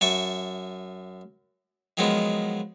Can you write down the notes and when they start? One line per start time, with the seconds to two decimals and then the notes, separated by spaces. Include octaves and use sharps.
0.01 F#2 E5 A5 C#6
1.97 D#3 F3 F#3 G#3 B3